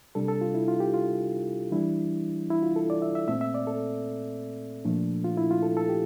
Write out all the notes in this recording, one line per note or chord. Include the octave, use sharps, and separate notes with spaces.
C3 G3 D4 A4
A4
F4
E4
F4
G4
F4
E3 G3 D4 E4
E4
F4
A4
D5
E5
E5
A#2 A3 C4 E5
E5
D5
A4
A#2 F3 A3 D4
F4
E4
F4
A4
A4
G4